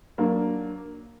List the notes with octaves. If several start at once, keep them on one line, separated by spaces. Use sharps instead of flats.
F#3 A#3 D4